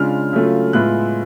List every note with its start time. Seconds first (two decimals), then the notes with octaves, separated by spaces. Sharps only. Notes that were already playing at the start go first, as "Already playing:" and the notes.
Already playing: C#3 G#3 D4 F4 F6
0.33 C#3 F#3 A3 F4
0.73 A2 G#3 B3 F4 F#6